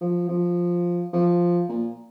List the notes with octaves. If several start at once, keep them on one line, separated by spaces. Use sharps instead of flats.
F3
F3
F3
A#2